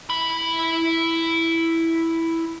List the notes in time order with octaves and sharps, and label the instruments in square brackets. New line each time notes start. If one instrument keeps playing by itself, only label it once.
[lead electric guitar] E4 B5